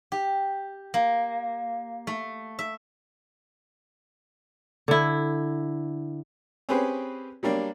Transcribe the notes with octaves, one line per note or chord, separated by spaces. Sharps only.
G4
A#3
A3
E5
D3 E4
C4 C#4 G4 G#4 B4 C5
F#3 G3 A#3 D4